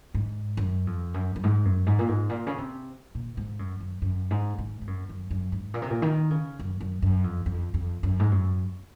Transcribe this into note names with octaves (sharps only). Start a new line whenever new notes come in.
G#2
F#2
F2
F#2
F#2
G#2
F#2
G#2
A#2
G#2
A#2
C#3
C3
A#2
G#2
F#2
F#2
F#2
G#2
G#2
G#2
F#2
F#2
F#2
G#2
A#2
C3
A#2
D#3
C#3
F#2
F#2
F#2
F2
F2
F2
F#2
G#2
F#2